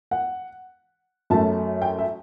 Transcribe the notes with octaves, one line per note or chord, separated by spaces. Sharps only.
F#5
F#2 F#3 A3 A5
G5
E5